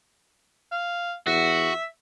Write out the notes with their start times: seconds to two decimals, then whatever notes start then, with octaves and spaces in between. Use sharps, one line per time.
0.72 F5
1.27 E2 F#4 E5